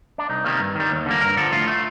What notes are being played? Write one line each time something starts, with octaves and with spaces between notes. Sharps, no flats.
D4
C2 D#4
C3 D#3 G3 A#3
G2
D#3 G3
D#2
D3 G3 A#3
G2 A#4
D3 F3 A4
A2 F4
A3